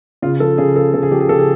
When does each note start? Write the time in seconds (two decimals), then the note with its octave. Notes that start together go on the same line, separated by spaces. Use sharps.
0.22 C#3 F4
0.40 F3 A4
0.58 C#3 G#4
0.76 F3 A4
0.94 C#3 A4
1.03 G#4
1.11 F3 G4
1.20 G#4
1.29 C#3 A4
1.39 G#4